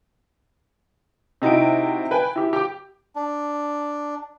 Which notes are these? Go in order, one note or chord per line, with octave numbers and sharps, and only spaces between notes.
C3 D#4 E4 F#4 D7
B4 G5 G#5
E4 G4
G4 G5 D6
D4